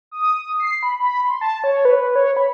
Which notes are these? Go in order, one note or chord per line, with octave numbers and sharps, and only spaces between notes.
D#6
C7
B5
B5
C6
A5
C#5
B4
C#5
B5